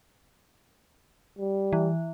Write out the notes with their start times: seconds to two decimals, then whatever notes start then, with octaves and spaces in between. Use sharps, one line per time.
1.39 G3
1.73 E3